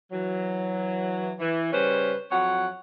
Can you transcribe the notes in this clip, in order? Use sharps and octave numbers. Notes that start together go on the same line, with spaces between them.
E3 F#3
E3
C#3 G3 C#4 B4 C5
F2 F#3 C#5 F#5